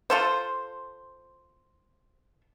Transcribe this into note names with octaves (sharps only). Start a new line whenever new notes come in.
F4 A4 C5